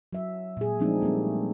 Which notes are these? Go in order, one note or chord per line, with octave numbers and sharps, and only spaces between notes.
F#3 E5
A#2 G#4
F3 G#3 A3 C4 D4 D#4
G3 A3 A#3 C4